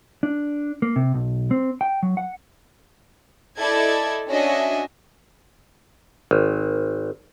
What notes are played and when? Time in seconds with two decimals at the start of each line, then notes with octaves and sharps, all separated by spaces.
0.23 D4
0.82 A#3
0.96 C3
1.14 B1
1.51 C4
1.81 G5
2.03 F#3
2.17 F#5
3.59 E4 A4 D5 D#5 A5 G#6
4.29 C#4 D4 F#4 D#5 E5 G#5
6.31 G#1